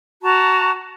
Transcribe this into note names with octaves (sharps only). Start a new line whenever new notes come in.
F#4 A5 A#5